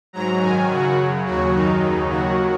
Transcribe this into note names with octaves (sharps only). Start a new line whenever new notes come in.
G#2 F#3 A#5
F#2 D#3 F#3 G#5
F#2 C#3 F#3 F#4
F#2 C#3 F#3
D#2 C#3 F#3 F#4
F#2 D#3 F#3 D#4
D#2 C#3 F#3
D#2 D#3 F#3 F#4